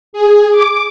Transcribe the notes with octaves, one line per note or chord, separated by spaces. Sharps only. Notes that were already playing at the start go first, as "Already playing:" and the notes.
G#4
D6